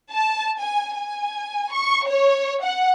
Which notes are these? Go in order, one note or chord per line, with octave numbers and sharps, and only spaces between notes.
A5
G#5
G#5
C#6
C#5
F#5